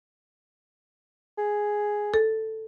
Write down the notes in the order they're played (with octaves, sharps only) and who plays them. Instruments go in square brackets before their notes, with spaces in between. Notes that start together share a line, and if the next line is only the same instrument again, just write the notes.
[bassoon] G#4
[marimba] A4